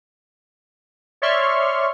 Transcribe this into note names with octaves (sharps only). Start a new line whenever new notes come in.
C#5 D5 E5 C6 C#6 F6